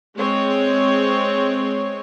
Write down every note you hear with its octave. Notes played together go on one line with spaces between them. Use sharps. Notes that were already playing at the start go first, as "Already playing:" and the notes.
G#3 C4 C#5